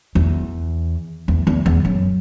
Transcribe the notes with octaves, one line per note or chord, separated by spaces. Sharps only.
E2
E2
E2
E2
F#2